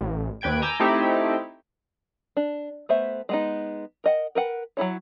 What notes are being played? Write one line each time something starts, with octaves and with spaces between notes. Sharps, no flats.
A1
D#2 B4 G5 G#6 D7
G#5 A#5 D6 E6 G6
A3 C4 D#4 E4 G4
D4
A3 B3 C5 E5
G#3 B3 D#4
A#4 D#5 F#5
A#4 B4 F#5
F#3 A#3 E4 C#5